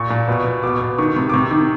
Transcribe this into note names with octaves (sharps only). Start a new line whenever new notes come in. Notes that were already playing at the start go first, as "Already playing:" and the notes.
Already playing: A#2 C#6
A#2
B2
B2
B2 D6
B2
D#3 C#6
C3
D6
C3 C#6
D#3